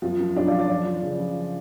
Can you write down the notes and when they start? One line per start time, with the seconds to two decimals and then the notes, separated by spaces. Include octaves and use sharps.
0.02 F#2 F3
0.19 F#2
0.36 F#2 D4
0.47 F4
0.53 F3
0.59 D5
0.70 F3 D5
0.86 F3
1.03 C#3
1.19 F3